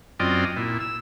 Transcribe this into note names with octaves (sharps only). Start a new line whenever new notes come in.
F#2 C4 F4 D5 D#5 G5
A#2 E4
E6